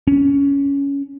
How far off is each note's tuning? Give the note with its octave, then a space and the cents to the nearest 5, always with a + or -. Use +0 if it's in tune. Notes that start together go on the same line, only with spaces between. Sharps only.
C#4 +15